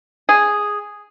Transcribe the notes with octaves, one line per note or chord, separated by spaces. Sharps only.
G#4